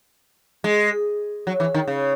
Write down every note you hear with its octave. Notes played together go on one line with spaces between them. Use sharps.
G#3
F#3
E3
D#3
C#3